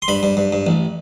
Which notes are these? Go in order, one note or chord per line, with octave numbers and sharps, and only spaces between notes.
C6
G2 B5
G2
G2
G2
A1